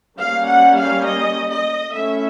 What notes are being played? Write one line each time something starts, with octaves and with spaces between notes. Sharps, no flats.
G3 A#3 C#4 F5
F#5
F5
D#5
D#5
A3 C#4 E4 E5